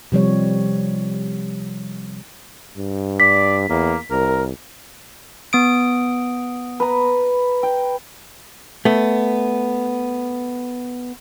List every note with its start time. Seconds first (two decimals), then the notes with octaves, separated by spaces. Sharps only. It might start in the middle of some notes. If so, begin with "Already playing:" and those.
0.12 C3 F3 G3 C#5
2.77 G2
3.20 D5 B6
3.69 E2 A#3
4.11 C2 A#4
5.53 B3 D#6 D7
6.80 B4 A#5
7.63 G5
8.85 A3 B3